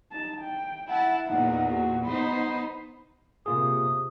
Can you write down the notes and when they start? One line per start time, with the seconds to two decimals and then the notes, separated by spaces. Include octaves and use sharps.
0.12 D#4 A5
0.41 G5
0.89 E4 F#5 A5
1.27 E2 A#2 D#4 F#5
1.70 F#4
2.05 B3 D#4 C5 B5
3.46 C3 A#3 F4 G#4 D#6